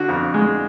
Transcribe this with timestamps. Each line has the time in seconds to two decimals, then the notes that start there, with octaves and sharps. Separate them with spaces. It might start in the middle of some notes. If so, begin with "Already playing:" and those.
Already playing: D3 F#4
0.09 F2
0.34 G#3